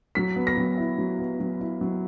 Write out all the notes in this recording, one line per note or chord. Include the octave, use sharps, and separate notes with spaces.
F#3 B6
B3
A#6
F#3
E4
F#3
B3
F#3
E4
F#3